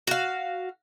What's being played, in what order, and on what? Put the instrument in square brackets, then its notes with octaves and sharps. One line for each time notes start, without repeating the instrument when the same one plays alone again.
[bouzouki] F#4 F5